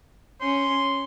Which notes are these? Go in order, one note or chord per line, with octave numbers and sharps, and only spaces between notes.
C#4 C6